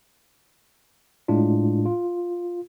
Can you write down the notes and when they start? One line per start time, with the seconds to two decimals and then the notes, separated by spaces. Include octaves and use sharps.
1.28 A2 G#3 D4 F4
1.85 F4